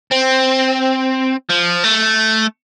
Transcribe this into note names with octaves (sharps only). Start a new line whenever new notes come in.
C4
F3
A3